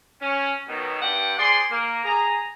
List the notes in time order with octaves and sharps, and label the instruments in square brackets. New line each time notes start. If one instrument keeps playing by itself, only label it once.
[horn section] C#4
B2 D#3 F#3
G2 F#5 G5
G#4 C5 D5 C6
A#3
G#4 A#5